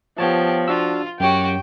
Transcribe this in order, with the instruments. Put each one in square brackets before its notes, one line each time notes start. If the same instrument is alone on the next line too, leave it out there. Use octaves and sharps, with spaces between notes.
[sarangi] F3 [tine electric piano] B3 C#5 A5 [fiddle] G4
[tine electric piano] D4 F#4 E6 [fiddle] F4
[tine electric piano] F#2 C#5 [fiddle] F#4 G4 [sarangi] G5